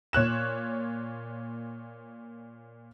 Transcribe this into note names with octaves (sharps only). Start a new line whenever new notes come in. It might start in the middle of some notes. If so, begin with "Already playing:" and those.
A#2 C#5 F#6 E7